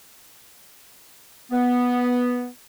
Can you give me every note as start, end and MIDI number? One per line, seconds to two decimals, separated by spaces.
1.51 2.47 59